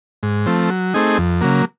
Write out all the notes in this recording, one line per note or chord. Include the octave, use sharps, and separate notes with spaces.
G#2
F3 A3 C4
F#3
A3 C4 D#4 G#4
F2
C#3 F#3 A#3